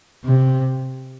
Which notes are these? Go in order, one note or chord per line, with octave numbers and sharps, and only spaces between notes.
C3